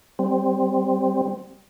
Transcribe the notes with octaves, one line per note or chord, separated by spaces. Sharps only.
G3 C4